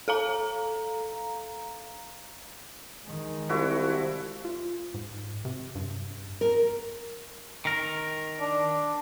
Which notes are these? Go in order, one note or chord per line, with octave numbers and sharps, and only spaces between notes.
A4 F5 A#5
D#3 G#3
C2 F3 E4 F#4
F4
G#2
C3
G2
A#4
D#3 A#4
D4